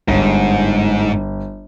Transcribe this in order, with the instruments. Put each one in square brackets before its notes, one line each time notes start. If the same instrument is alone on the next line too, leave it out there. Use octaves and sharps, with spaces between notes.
[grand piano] G1 [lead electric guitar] G#2